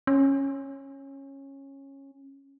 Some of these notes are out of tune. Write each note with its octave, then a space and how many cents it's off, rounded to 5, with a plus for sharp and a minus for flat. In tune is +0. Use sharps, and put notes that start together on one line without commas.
C#4 -15